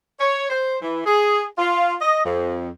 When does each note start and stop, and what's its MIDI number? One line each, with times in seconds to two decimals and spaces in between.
0.20 0.48 73
0.50 0.77 72
0.82 1.01 52
1.06 1.45 68
1.57 1.95 65
2.01 2.21 75
2.25 2.68 41